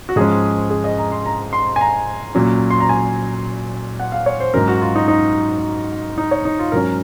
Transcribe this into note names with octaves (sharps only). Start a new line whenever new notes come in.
F#4
G#2 F3 G#3 C#4 G#4
G#4
D#5
A#5
C6
A#5
C6
G#5
A#5
A#2 F#3 C#4
C6
A#5
G#5
F#5
F5
C#5
C5
G#2 F#3 C#4 A#4
F#4
F4
D#4
D#4
D#4
C#5
D#4
F4
G#2 F#3 C#4 A#4